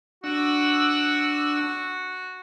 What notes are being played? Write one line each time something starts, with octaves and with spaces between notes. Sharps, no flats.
D4 F#4 F#5 E6